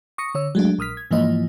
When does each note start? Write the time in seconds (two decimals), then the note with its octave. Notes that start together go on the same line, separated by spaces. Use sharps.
0.18 C#6 D#6 A#6 C#7
0.35 D3 C#5 E6
0.55 F#3 G#3 A3 D4
0.79 A#1 D#6 F6 B6
0.97 G#6
1.11 G#2 E3 F3 A#3 D#5